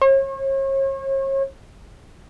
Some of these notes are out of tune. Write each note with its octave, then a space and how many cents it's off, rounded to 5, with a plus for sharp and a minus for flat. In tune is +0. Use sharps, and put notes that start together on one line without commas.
C#5 -40